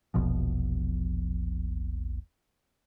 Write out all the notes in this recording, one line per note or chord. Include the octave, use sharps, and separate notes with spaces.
E1 A#1 B2 F3